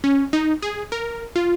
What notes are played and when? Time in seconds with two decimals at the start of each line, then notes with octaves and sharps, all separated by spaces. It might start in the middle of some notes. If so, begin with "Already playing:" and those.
0.04 C#4
0.33 D#4
0.62 G#4
0.92 A#4
1.36 F4